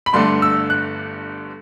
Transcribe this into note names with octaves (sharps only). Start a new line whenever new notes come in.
B5
G1 G2 D3 A3 D4 C6
E6
F#6